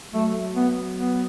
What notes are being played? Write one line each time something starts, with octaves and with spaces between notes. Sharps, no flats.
F#3 A3
B3
B3